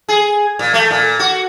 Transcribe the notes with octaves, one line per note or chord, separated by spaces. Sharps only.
G#4
A#2
A3
A#2
F#4